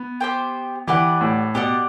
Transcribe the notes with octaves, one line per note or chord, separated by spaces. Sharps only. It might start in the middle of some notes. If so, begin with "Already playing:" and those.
Already playing: B3
G4 C5 G5
E3 G4 B4 D5 F#5
A2
B2 G4 D5 F#5